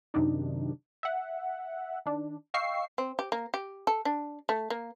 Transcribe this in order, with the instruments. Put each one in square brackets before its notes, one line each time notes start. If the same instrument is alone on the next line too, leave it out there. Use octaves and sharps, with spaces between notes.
[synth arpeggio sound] F#2 C3 D#3 D4 D#4
E5 F#5
D#3 D4
D#5 F5 G5 C#6 E6 C7
[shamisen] C4
G4
A#3
G4
A4
D4
A3
A#3